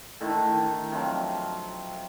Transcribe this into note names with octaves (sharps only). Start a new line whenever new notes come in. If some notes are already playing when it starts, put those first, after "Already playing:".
A2 D3 D#3
D#3
C3 F3 F#3